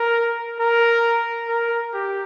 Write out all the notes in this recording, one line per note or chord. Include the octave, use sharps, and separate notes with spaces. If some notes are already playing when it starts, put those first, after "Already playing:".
Already playing: A#4
A#4
A#4
G4